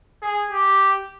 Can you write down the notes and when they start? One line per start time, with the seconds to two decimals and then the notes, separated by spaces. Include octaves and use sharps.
0.22 G#4
0.51 G4